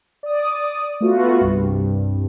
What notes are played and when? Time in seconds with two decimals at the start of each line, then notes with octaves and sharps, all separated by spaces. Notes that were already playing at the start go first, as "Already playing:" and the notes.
0.23 D5 D#6
1.01 A3 B3 F4 F#4
1.41 C2 G2